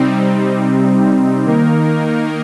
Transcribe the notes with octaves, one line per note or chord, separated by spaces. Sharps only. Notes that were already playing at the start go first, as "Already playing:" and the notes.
Already playing: C3 G3 C4 D#4
D#3 A#3 D#4 A#4